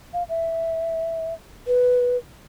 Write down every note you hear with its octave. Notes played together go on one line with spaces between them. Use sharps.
F5
E5
B4